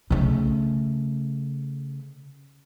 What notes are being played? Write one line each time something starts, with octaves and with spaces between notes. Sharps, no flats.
C#3 A3